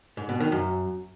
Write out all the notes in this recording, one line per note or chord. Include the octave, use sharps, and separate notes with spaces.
G#2
B2
D#3
F#2